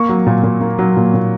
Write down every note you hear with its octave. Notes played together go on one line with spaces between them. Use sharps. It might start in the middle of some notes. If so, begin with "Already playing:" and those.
Already playing: A#3 C#6
F#3
A#2
A#2
A#3
F#3
A#2
A#2